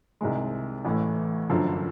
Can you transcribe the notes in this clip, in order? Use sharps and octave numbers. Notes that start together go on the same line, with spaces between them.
C2 C3 D#3 G#3
A1 A2 E3 A3
G1 F#2 D3 F3